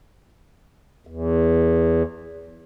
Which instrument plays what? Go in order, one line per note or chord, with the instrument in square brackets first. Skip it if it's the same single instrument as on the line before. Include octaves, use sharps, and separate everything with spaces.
[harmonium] E2